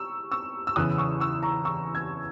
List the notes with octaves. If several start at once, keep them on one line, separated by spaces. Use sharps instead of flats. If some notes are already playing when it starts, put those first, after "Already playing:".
Already playing: C#6 E6
C#6 E6
E6
E2 C#3 E3 D#6 F#6
C#6 E6
C#6 E6
A#5 C#6
C#6 E6
E6 G#6